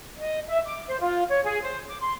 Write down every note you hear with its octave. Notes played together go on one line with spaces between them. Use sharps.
D#5
E5
D6
C5
F4
C#5
G#4
C5
D6
C6